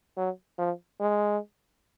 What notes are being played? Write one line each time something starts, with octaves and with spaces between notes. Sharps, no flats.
F#3
F3
G#3